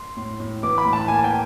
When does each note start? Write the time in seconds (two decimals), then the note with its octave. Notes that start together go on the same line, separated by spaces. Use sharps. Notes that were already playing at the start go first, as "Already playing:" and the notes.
Already playing: C6
0.17 A2
0.40 A2
0.63 E3 D6
0.78 B5
0.85 A2
0.93 A5
1.08 A#3 G#5
1.24 G5